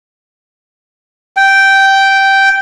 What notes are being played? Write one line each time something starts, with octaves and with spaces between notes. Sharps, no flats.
G5